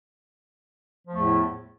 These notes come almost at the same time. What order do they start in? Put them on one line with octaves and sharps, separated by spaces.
F3 A3 E2 A2